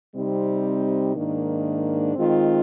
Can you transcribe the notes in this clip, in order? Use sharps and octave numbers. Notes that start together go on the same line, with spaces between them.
C3 G3 C4 D#4
G#2 D#3 A#3 D4
D#3 G#3 C4 F4